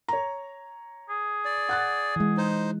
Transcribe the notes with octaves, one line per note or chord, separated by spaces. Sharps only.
C#5 A#5
G#4
D5
F#5 F#6 A6
E3 G#3
D#4 C5